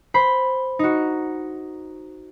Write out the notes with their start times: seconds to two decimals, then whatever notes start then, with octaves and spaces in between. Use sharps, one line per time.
0.14 C5 B5
0.79 D#4 F#4